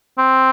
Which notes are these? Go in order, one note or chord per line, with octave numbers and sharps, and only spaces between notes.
C4